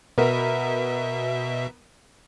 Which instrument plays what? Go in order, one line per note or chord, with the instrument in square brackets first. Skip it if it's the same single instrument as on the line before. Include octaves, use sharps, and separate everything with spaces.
[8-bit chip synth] B2 E5 [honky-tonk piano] B3 A#4